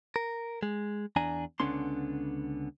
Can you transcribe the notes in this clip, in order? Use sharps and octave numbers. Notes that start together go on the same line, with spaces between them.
A#4
G#3
E2 D4 G#5 A#5
C#2 D3 B3 C#4 D4 C6